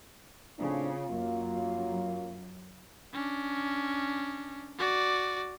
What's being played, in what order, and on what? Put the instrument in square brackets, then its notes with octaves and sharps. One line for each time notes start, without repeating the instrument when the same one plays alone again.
[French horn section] A2 C4 D4 [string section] C#3 [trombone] F4
[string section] F#2 [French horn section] F#3 A#3
[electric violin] C#4 D4
F#4 D5